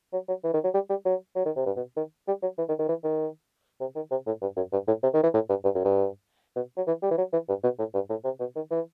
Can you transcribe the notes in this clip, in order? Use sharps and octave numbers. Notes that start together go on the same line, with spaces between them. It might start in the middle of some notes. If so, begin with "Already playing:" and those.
F#3
F#3
E3
D#3
F#3
G3
G3
F#3
F#3
D#3
C3
G2
B2
D#3
G3
F#3
E3
D#3
D#3
E3
D#3
C3
D#3
C3
A2
G2
F#2
G2
A2
C3
D#3
E3
A2
G2
G2
F#2
G2
B2
F#3
E3
G3
E3
F#3
E3
G2
B2
A2
G2
A2
C3
B2
D#3
E3